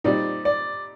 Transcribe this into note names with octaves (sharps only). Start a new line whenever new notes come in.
A#2 G3 C4 D#4 D5
D5